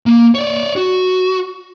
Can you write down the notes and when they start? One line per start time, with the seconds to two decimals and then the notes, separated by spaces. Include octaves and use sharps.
0.06 A#3
0.35 C#5 D5
0.76 F#4